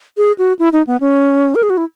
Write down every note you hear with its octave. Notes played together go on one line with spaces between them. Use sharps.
G#4
F#4
E4
D#4
B3
C#4
A#4
G#4
F#4
E4